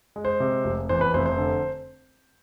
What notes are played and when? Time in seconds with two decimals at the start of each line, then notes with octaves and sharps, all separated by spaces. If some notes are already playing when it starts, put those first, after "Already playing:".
0.16 G#3
0.25 C5
0.40 C3
0.64 F1
0.89 E2 C5
1.01 B4
1.14 F1 C5
1.26 C5
1.38 D3